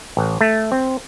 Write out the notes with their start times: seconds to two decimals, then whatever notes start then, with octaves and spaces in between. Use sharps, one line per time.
0.17 A1
0.41 A3
0.72 C4